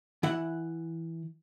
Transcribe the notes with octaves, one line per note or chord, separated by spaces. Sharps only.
E3 E4 F#5